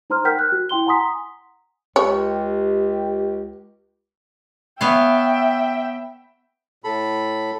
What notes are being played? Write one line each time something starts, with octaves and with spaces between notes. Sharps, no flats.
D#4 C5 A#5 C6 F6
A#4 F#5 G5 F6 G6 B6
F#6
F#4
E4 G5 C6 G7
F#5 G#5 A#5 C6 D#6 B6
C#2 G4 C#5
B3 C#5 E5 F5 G5
A2 A4 B5